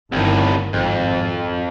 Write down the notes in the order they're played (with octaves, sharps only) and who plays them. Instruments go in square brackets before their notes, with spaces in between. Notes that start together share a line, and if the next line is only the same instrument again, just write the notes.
[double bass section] G1 D#3 [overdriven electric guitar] C2 A2
[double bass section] G#1 [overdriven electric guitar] F2